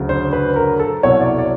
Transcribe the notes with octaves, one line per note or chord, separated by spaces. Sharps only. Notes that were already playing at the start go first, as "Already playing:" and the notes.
Already playing: D2 C#3 F#3
C5
B4
A#4
A4
C2 B2 F#3 C#5
D5
D5